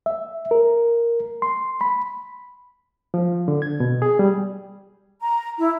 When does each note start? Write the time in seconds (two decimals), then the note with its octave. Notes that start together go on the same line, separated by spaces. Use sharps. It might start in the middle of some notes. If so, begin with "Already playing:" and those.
0.06 E5
0.51 A#4
1.42 C6
1.81 B5
3.14 F3
3.48 D3
3.62 G#6
3.80 B2
4.02 G#4
4.19 G3
5.22 A#5
5.59 E4